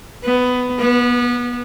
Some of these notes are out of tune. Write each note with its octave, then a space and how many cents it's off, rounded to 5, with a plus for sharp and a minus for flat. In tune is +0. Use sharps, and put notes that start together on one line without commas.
B3 +15
B3 -25